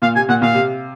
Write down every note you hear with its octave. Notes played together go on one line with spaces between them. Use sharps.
A#2 F5
C3 G#5
A#2 F#5
A#2 F5
C3